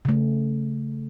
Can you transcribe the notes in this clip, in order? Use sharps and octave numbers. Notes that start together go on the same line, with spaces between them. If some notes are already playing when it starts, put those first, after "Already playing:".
C#3 A3